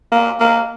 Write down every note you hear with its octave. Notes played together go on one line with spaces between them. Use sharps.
A#3
A#3